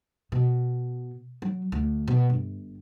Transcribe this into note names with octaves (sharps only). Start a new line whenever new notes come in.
B2
F#3
D2
B2
G1